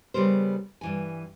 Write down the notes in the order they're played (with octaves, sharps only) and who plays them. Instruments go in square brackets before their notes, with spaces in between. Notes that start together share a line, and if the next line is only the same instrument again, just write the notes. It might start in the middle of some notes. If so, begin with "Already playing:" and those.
[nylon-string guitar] C#3 G3 B3 A#4 C5
G2 E3 G#5